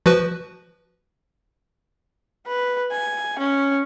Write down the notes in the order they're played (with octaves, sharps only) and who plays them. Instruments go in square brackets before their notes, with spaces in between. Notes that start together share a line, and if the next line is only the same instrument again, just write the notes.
[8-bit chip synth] F3 F#4 B4
[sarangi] B4
G#5
C#4